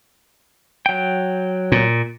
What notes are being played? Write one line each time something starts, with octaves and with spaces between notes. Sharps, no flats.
F#3 G5
A#2